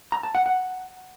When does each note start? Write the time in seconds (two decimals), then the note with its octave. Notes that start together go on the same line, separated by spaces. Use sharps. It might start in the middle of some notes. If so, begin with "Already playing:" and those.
0.12 A#5
0.23 A5
0.35 F#5
0.46 F#5